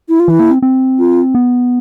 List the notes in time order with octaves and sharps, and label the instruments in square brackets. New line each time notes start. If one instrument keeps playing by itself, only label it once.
[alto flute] E4
F4
[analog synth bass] E3 [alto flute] E4
[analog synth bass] A#3
C4
C4
[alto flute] F4
[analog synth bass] B3